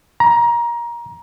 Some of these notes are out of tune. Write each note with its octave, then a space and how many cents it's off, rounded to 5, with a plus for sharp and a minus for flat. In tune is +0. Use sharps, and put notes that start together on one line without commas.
A#5 +20